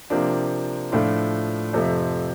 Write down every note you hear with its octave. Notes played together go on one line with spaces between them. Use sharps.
C3 F3 A#3 D4
A2 F3 A3 D4 F4
F2 C3 F3 A3